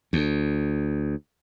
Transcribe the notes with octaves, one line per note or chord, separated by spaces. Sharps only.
D2